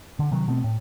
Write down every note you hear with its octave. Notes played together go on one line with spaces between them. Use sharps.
D3
C3 D#3 F#3
B2 A3 B3 C4
A2